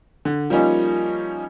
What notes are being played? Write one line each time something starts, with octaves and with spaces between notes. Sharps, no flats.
D3
F3 G3 A#3 C#4 D#4 F4